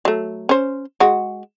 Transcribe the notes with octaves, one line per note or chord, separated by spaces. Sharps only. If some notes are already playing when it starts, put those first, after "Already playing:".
F#3 A3
C#4 C5
G#3 F#4